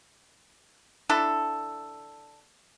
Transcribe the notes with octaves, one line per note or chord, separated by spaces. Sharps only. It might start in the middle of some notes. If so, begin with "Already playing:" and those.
D3 D4 E4 A4